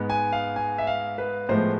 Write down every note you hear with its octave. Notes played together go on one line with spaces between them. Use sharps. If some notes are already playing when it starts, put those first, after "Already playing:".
Already playing: G#2 G#3 B3
G#5
F5
G#5
E5
F5
B4
A2 F3 G#3 B3 C5